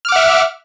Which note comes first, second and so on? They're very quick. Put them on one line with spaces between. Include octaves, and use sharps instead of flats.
F6 D6 F#5 E5